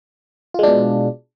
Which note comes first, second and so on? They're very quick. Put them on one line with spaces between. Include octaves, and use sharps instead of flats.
F4 G#3 D4 B2